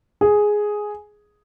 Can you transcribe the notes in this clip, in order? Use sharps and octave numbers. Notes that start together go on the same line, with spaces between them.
G#4